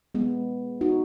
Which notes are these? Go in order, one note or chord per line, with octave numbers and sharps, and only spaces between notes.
G#3 B3
D#4 F#4